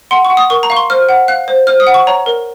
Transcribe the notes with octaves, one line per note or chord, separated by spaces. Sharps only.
F#5 C6
C#6
F#5
D#6
A#4 C#6
A#5
F5 C#6
C6
C5 F6
F#5
F5 F#6
C5
C5 F6
D#6
F#5
C#6
C#5 A#5
A#4